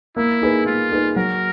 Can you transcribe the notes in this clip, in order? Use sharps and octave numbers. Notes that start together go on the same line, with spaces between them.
A#3 E4
D#4 G#4 B4
A#3 F4
D#4 G#4 B4
F#3 A#4